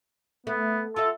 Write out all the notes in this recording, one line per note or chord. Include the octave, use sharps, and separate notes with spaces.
A3 B3
F4 F#4 A4 E5